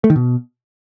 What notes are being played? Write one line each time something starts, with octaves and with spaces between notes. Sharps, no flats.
A3
D#3
B2